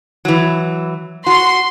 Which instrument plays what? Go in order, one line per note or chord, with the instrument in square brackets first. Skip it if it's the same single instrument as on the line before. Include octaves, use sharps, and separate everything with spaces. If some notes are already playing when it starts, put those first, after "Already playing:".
[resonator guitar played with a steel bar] E3 F#3
[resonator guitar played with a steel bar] F#4 [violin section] C6